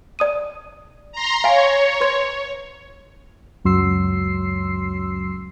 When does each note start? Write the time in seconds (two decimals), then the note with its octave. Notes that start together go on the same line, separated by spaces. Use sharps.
0.19 D5 D#6 D#7
1.12 A#5 C6
1.44 C#5 F5 G#5
2.01 B4 C6 G#6
3.64 C#2 F#2 F#3 C6 E6 C7